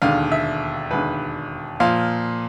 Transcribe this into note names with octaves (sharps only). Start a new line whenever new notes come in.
E1 D#2 D3 F5
E5
E1 D#2 D3 B4
A#2 F3 F5